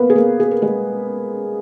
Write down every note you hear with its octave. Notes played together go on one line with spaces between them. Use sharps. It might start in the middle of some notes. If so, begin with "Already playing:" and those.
Already playing: A#3 B3 A#4 B4
G#4
A#3 A#4
G#4
A#4
G#3 G#4